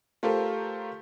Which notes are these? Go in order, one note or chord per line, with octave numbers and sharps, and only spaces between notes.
A3 F4 G4 A4 A#4 C5